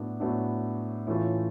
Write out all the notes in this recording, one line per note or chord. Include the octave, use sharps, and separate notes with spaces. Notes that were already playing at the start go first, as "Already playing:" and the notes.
Already playing: A2 F#3 B3 D4
A2 F#3 B3 D4
A2 E3 A3 C#4 F4